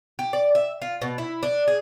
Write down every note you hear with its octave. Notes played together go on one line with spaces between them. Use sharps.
G4
D5
E5
F4
B2
E4
D4
G#4